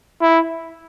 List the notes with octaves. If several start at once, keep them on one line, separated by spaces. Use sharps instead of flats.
E4